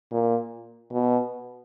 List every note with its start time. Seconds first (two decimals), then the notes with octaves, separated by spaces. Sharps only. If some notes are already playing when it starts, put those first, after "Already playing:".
0.12 A#2
0.93 B2